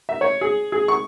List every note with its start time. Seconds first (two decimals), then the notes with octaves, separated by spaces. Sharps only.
0.09 E5
0.21 C#5
0.41 G#4
0.72 G#4
0.88 C#6